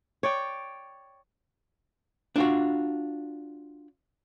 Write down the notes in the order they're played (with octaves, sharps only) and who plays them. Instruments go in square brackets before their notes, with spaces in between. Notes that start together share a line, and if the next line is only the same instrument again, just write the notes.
[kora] C#5 D5 G5
[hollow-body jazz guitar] D4 F4 F#4